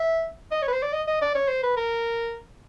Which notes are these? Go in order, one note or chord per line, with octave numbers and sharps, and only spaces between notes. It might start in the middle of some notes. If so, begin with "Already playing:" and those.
Already playing: E5
D#5
C#5
B4
C5
D5
D#5
D#5
D5
C#5
C5
B4
A#4